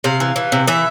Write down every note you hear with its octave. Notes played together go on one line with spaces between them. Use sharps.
C3 F5
E3
E3
C3
E3 E5